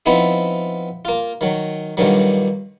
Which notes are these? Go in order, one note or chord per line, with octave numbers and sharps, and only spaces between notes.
F3 B3 C4 D#4 E4
A#3 F4
D#3 F#3
G2 A#2 D3 D#3 F#3